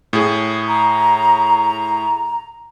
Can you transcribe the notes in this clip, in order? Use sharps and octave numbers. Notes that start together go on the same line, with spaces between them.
A2 G#4
A#5